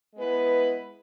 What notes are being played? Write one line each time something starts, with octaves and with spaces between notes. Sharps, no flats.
G#3 B3 E4 G#4 B4